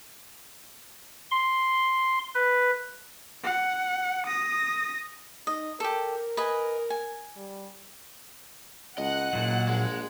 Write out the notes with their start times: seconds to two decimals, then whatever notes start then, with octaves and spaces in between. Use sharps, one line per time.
1.31 C6
2.35 B4
3.44 F#5
4.26 D#6 A#6
5.47 D#4 D#5
5.80 G4 A4 A#4
6.37 B4 D#5 G#5
6.90 G#5
7.36 G3
8.98 C#2 D#5 F#5 F#6
9.33 F#1 A#2 F#3
9.68 A#1 G#3